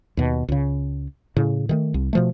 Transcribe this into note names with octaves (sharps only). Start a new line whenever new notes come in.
D#2 B2
C#2 C#3
A2 C#3
D#3 E3 A3
C2
B2 F3 A3